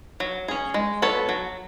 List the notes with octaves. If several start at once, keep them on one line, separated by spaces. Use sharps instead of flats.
F#3
C#4 G#4
G#3
B3 F#4 A4 C#5
F#3